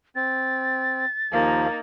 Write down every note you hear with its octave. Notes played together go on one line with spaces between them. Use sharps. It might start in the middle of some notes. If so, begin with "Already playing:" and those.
C4 A6
D#2 F3 A#3 D#4